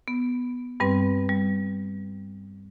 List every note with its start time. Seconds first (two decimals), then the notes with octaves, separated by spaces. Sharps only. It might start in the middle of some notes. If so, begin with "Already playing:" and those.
0.08 B3
0.80 G2 G3 C4 B4
1.29 G3